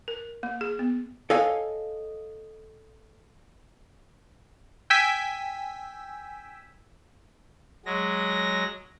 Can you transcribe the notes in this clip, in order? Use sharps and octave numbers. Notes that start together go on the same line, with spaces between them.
A#4
A#3
G#4
B3
A4 C#5 D#5 F5 G#5
G5 G#5 E6 B6
F#3 G#3 A#6